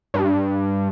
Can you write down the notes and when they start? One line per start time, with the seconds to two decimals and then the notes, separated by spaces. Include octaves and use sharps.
0.14 G2